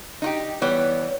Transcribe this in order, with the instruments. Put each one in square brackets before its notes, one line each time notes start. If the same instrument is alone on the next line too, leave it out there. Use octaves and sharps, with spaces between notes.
[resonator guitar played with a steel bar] D#4 F4 G4
[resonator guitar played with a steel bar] E3 G3 B3 [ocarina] C#5